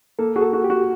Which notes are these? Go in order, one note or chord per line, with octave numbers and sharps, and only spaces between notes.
A#3 A4
F#4 G#4
A4
F#4
G4
F#4